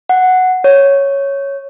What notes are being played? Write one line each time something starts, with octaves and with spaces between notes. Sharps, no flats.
F#5
C#5